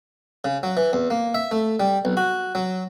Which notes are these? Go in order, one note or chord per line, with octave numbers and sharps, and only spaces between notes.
C#3
F#3
E3
E2
A#3
E5
A3
G3
B1
F#4
F#3